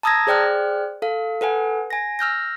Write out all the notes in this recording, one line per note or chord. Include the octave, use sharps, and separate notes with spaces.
A5 A#5 D#6 E6 G#6 A#6
G#4 C5 D5 G5 F6 F#6
A4 F5
A4 B4 F#5 G#5
G#5 A#6
E6 F6 G6 A#6